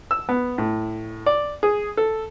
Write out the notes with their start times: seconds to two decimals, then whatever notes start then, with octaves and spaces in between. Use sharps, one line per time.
0.11 E6
0.29 B3
0.58 A2
1.26 D5
1.63 G#4
1.97 A4